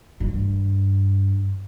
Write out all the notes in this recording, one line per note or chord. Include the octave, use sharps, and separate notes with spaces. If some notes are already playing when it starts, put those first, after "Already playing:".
G2 D#3